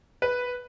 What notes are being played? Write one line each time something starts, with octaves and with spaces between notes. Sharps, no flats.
B4